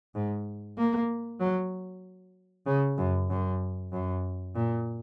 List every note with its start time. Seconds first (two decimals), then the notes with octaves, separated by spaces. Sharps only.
0.15 G#2
0.77 A#3
1.40 F#3
2.66 C#3
2.98 F#2
3.29 F#2
3.92 F#2
4.55 A#2